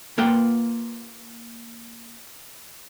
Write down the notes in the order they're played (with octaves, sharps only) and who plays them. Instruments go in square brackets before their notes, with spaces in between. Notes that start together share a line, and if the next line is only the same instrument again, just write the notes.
[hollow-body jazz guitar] A#3 F4 B4 F#5 G5